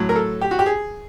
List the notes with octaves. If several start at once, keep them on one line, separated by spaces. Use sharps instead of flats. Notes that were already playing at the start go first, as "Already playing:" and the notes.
Already playing: A2 F#3
A#4
A4
G4
F#4
G4
G#4